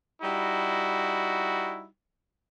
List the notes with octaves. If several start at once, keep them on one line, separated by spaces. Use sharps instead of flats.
G3 D#4 E4 F#4